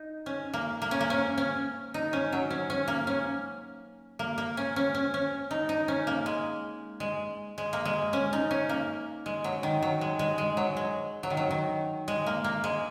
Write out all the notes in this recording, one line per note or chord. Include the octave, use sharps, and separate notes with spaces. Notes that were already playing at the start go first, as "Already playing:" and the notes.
Already playing: D#4
C#4
A#3
A#3
C#4
A#3
C#4
C#4
D#4
C#4
F#3
C#4
C#4
A#3
C#4
A#3
A#3
C#4
C#4
C#4
C#4
D#4
D#4
C#4
A#3
G#3
G#3
G#3
A#3
G#3
C#4
D#4
C#4
A#3
G#3
F#3
D#3
F#3
G#3
G#3
G#3
F#3
G#3
F#3
D#3
F#3
D#3
G#3
A#3
A#3
G#3